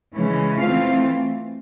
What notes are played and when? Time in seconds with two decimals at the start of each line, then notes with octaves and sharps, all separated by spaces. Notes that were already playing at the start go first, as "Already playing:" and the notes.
0.14 C#3 E3 G#3 C#4
0.58 E3 A3 C4 F4 F5